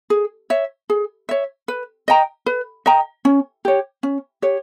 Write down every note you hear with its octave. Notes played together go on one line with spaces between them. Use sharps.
G#4
C#5 E5
G#4
C#5 E5
B4
D#5 G5 A#5
B4
D#5 G5 A#5
C#4
G4 C#5
C#4
G4 C#5